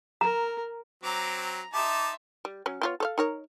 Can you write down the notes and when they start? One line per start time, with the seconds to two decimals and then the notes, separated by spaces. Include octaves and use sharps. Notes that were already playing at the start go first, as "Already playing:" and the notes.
0.21 A#4 A#5
1.03 F#3 C4 A#5 D6
1.40 A#5
1.74 D#4 E5 A5 C6 D6
2.45 G3
2.66 F#3 C#4
2.82 B3 F4 C#5
3.00 A4 C#5 F5
3.18 D#4 A#4 C#5